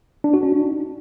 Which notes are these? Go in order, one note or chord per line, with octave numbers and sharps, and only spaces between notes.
D4
F#4
C#4
D4
D#4